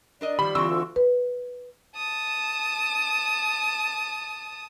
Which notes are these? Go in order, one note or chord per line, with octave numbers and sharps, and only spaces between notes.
D4 A#4 D5 D#5
D#3 F3 G3 B5
D3 E3 C4 F4 C6 C#6 E6
D2
B4
A5 D#6